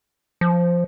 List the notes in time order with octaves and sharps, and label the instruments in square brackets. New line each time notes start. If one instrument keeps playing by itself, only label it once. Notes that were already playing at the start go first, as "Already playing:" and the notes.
[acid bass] F3